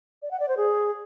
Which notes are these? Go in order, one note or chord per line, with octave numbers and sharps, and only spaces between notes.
D5
F#5
D5
C5
G#4